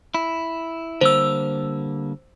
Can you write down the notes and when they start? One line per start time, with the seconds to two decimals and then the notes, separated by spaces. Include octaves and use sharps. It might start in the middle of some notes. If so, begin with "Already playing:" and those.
0.14 E4
1.01 D3 G3 A#3 C5 E6